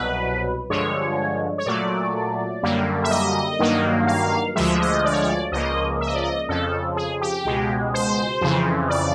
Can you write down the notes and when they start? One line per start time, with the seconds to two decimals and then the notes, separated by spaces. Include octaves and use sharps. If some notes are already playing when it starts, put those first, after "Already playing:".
Already playing: C2 B2 F#3 B4
0.70 G2 D3 F3 G#3 C#5
1.58 C#5
1.66 A#2 F#3 A3 D5
2.63 F#2 D3 G3 A#3
3.04 E5
3.11 D#5
3.59 G2 D#3 F#3 A#3
4.07 F5
4.56 D2 D3 F3 G#3 E5
4.81 D#5
5.05 D5
5.13 C#5
5.22 D5
5.52 C#2 C#3 F3 A#3 D#5
6.01 E5
6.07 D#5
6.15 D5
6.22 D#5
6.49 F2 C#3 F3 A4
6.96 G#4
7.21 G4
7.45 C#2 B2 G#3
7.94 C5
8.41 F2 C#3 E3
8.90 D5